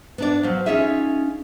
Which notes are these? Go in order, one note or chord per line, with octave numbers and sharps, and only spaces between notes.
B3 D4 D5
F3 F#3
C#4 D#4 F4 G#4 E5